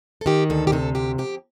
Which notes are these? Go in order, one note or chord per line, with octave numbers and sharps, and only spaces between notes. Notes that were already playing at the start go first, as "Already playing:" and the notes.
A4
D#3 G4
D2 A4
G4
C3 A4
D2 G4
F2 G4